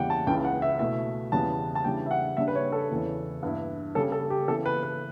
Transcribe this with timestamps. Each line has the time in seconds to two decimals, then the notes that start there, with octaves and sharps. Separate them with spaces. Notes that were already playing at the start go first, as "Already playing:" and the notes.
Already playing: E2 C#3 E3 G3 F#5 G5
0.10 A5
0.27 C#2 C#3 E3 G5
0.45 F#5
0.62 E5
0.79 B2 A3 E4 E5
1.32 E2 C#3 E3 G3 B3 A5
1.75 A5
1.84 C#3 E3 G3 D4 G5
2.06 E5
2.11 F#5
2.37 C#3 G3 D4 E5
2.48 B4
2.55 C#5
2.72 A4
2.91 E2 C#3 E3
3.43 G2 E3 B3 E4
3.95 C#3 G3 C#4 A4
4.12 A4
4.30 G4
4.48 C#3 E3 B3 A4
4.66 B4
4.83 B4